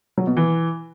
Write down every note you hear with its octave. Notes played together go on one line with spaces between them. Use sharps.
F#3
B2
E3